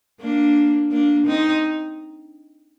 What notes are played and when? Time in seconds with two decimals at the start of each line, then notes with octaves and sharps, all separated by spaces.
0.20 A#3 D4
0.91 A#3 D4
1.27 C4 D#4